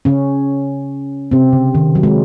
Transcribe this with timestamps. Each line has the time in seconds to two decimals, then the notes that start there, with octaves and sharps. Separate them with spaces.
0.05 C#3 C#4
1.31 C3 C4
1.53 C#3
1.75 D#3
1.95 F#3
2.03 G#3